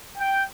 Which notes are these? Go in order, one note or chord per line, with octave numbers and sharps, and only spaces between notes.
G5